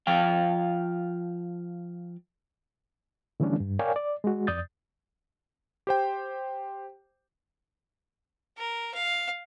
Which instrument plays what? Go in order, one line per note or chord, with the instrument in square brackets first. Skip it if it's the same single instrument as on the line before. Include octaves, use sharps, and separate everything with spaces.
[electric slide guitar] F3 F5 G5
[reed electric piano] D3 E3 G3 A3 C#4 D4
G2
A#4 C#5 D5 F5 G5 G#5
D5
G#3 F#4
F2 D5 D#6 G6 A6
[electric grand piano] G4 C5 G5
[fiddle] A#4
F5